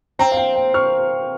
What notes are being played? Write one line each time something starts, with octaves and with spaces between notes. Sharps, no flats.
C4 G5 A#5
F5
G5
G5
C#6 F6